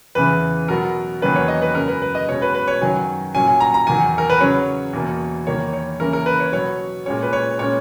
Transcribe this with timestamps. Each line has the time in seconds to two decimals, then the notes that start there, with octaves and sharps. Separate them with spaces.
0.15 E2 C#3 E3 B4
0.68 B2 F#3 B3 A#4
1.22 E2 D#3 F#3 A#3 C#4 B4
1.36 C#5
1.48 D#5
1.62 B4
1.75 F#2 C#3 G#3 A#4
1.88 B4
2.02 B4
2.15 D#5
2.28 B2 G#3 C#4 C#5
2.42 B4
2.55 B4
2.68 C#5
2.81 F#2 D#3 F#3 G#5
3.35 A#2 F#3 C#4 G#5
3.47 G#5
3.61 A#5
3.74 A#5
3.87 E2 D#3 F#3 G#5
4.18 A#4
4.30 B4
4.40 C#3 F#3 C#4 C#5
4.93 E2 B2 A#3
5.47 E2 D#3 A#3 C#5
5.73 C#5
6.00 C#3 E3 A#3 C#4 A#4
6.13 A#4
6.26 B4
6.40 C#5
6.52 B2 F#3 B3 C#5
7.06 A#2 G#3 C#4 C#5
7.23 B4
7.33 C#5
7.59 A#2 G#3 C#4 C#5